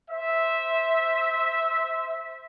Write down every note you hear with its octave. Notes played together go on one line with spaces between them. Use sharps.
C5 E5